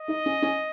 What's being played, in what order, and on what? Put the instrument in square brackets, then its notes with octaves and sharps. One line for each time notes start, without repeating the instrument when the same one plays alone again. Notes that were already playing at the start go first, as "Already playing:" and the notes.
Already playing: [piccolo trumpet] D#5
[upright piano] D#4
C#4
C#4